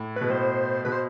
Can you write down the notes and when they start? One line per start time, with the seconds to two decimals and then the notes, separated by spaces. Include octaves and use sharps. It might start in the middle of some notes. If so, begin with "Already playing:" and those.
Already playing: A2
0.16 B2 B4
0.30 A2 C5
0.85 B2 B4
0.92 C5